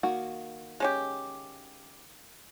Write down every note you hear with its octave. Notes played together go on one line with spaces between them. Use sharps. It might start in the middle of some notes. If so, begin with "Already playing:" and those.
D#3 A#3 F#4
G#3 C#4 G4